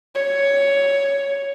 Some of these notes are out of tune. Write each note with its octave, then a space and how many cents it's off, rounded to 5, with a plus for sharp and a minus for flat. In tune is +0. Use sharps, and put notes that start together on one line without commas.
C#5 +10